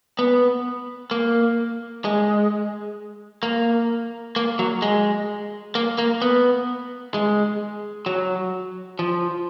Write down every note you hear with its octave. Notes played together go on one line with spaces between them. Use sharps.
B3
A#3
G#3
A#3
A#3
F#3
G#3
A#3
A#3
B3
G#3
F#3
F3